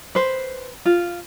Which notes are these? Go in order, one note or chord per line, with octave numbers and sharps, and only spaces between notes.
B4 C5
F4